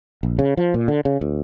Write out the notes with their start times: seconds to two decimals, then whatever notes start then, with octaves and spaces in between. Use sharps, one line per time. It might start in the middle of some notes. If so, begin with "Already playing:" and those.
0.23 A#1
0.39 C#3
0.57 F3
0.74 A#2
0.88 D3
1.05 C#3
1.21 D2